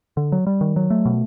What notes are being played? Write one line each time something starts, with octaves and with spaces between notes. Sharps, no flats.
D3
F#3
G3
D#3
F#3
A3
B2